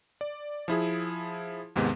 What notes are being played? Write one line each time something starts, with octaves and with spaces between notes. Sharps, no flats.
D5
F3 E4 G#4
D#2 G#2 C3 G#3 B3